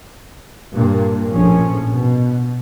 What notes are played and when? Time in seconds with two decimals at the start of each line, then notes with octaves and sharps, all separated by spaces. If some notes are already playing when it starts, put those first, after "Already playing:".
0.73 G2 A#2 A#3
1.31 A#1 A2 F3 C#4
1.90 B2